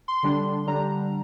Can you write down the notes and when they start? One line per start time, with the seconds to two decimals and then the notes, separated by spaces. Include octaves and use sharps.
0.08 C6
0.23 D3 G3 D4 C6
0.67 D3 G3 D4 A#5